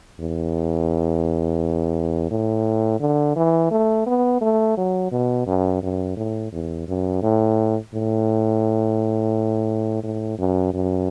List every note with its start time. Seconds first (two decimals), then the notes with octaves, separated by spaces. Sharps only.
0.20 E2
2.31 A2
3.00 D3
3.36 E3
3.71 A3
4.06 B3
4.41 A3
4.77 F#3
5.12 B2
5.47 F#2
5.83 F#2
6.17 A2
6.52 E2
6.88 F#2
7.23 A2
7.93 A2
10.03 A2
10.39 F#2
10.74 F#2